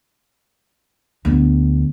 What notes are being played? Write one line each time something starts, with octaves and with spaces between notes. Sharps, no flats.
D2 B3